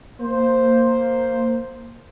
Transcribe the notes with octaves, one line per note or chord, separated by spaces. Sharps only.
A#3 C5